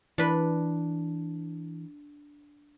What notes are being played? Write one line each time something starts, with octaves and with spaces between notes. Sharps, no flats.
E3 D4 B4